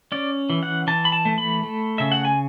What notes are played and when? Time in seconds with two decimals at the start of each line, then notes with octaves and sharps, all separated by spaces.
0.12 C#4 D5
0.50 E3
0.63 F#5
0.87 E3 A5
1.05 B5
1.12 A5
1.25 A3
1.38 B5
1.63 A3
1.98 C#3 E5
2.12 F#5
2.25 G#5